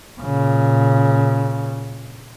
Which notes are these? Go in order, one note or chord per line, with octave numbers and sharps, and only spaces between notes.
A#2 C#3